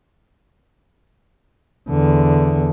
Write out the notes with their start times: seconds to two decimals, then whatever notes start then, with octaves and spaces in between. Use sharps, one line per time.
1.90 E2 D3